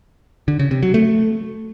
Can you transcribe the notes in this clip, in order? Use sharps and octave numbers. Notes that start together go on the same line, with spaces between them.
D3
C#3
C3
F#3
A3